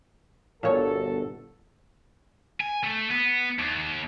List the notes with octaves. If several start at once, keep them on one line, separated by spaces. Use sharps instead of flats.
G1 A#2 F#4 A4 C#5
G#5
A3
B3
D#2